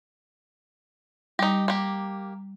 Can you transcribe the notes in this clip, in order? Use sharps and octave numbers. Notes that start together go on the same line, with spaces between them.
G3 D#4 G4
A#3 G4